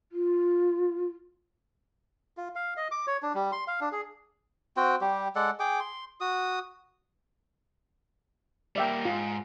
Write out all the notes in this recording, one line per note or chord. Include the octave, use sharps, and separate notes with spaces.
F4
F4
F5
D#5
D6
C#5
D4
G3
C6
F5
D4
G#4
C4 F#4 G5
G3 G4
G#3 A4 D5 F#5
G#4 G5 D6
C6
F#4 D#6
G3 A#3 D5 E5 G5
G#2 F4